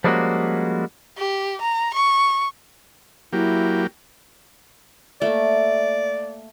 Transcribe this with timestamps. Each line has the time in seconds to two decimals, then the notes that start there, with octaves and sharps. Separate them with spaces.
0.04 F3 G3 G#3 A#3 C#4 F#4
1.18 G4
1.61 A#5
1.94 C#6
3.33 F#3 A#3 E4 G4
5.22 A3 A#3 D5